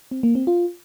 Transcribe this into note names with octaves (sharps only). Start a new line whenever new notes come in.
C4
A#3
C4
F4